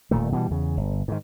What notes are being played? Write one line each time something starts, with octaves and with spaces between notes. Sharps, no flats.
D#1 A#2 D#3 A3
B2 E3 G3
E2 C#3
G1
G#2 D#3